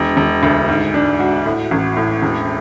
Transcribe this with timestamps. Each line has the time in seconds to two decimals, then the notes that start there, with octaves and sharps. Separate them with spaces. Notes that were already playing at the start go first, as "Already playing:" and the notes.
Already playing: E1
0.17 E1
0.43 D2
0.68 G#2
0.94 D4
1.20 F#4
1.46 A2
1.71 A1
1.96 A2
2.22 E1